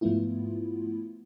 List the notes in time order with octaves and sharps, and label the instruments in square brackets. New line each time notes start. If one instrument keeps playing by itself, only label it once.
[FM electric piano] G#2 F3 A3 B3 E4 F4